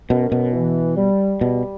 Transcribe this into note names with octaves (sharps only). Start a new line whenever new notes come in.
F#2 B2
B2
E3
G3
B2 G3